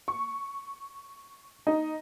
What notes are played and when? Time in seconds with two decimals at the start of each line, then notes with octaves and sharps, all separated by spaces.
0.08 C#6
1.67 D#4